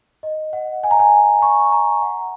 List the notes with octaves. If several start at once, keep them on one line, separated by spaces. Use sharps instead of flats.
D#5
F#5
G#5
A#5
G#5
C#6
A#5
F#5